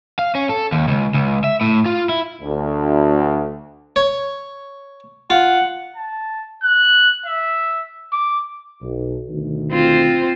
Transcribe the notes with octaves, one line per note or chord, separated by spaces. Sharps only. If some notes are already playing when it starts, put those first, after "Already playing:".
F5
C#4
A4
D#2
C#2
C#2
E5
A2
F4
E4
D2
C#5
F4 F#5
A5
F#6
E5
D6
B1
D2 B2 D#3
C4 F4 C5